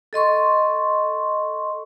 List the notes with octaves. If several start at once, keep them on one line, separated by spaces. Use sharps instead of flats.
A4 D#5 C6 C#6